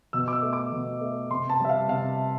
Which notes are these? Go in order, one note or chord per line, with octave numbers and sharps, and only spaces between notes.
B2 E6
D6
E6
A3
D6
B2
A3
C3 C6
A5
G3 E5
F5
C3 F5